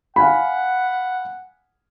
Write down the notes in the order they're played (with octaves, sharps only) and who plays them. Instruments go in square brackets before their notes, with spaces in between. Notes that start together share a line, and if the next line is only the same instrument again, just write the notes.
[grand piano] F5 G#5 B5 [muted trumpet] F#5